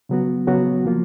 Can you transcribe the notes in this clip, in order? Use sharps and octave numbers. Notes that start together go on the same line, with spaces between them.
C#3 F#3 B3 F#4
C#3 F#3 B3 F#4
F3 A#3 F4